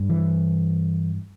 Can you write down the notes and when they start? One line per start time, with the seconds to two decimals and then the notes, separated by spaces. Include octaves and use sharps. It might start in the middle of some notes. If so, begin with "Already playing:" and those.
Already playing: G2
0.10 E3